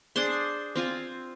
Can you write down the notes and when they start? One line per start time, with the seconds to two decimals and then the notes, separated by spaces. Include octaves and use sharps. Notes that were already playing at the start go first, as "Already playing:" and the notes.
0.16 D4 G#4 C5 C6
0.76 C4 F4 G#5